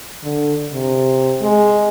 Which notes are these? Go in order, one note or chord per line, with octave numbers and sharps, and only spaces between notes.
D3
C3
G#3